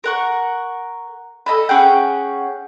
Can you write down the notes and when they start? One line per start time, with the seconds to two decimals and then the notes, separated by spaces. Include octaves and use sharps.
0.04 A#4 F#5 C#6
1.46 A4 D#5 A5 B5
1.69 C#4 G#4 F#5 G5